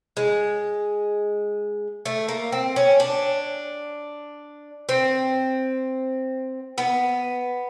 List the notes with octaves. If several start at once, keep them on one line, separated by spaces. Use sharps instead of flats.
G#3
A3
A#3
C4
C#4
D4
C4
B3